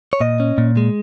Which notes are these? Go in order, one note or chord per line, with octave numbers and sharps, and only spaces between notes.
C#5
A#2 D#5
C#4
A#2
G#3